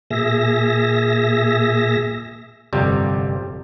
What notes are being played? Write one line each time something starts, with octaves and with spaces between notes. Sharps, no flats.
A#2 G#4 E5 A#6
G1 F2 C3 G3